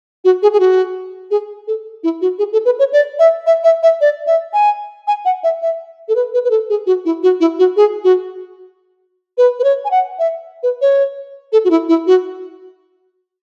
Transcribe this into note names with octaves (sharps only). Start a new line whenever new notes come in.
F#4
G#4
G#4
F#4
G#4
A4
E4
F#4
G#4
A4
B4
C#5
D5
E5
E5
E5
E5
D5
E5
G#5
G#5
F#5
E5
E5
A4
B4
B4
B4
A4
G#4
F#4
E4
F#4
E4
F#4
G#4
F#4
B4
B4
C#5
G#5
F#5
E5
B4
C#5
A4
F#4
E4
E4
F#4